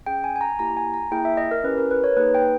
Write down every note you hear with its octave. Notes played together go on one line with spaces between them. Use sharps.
C#4 G#4 G5
G#5
G#5
A#5
A#3 E4 G4 A#5
G#5
A#5
A#3 E4 G#4 G5
E5
D#5
A#4
C#4 E4 G4 B4
A#4
B4
C#5
A#3 D#4 G#4 B4
G5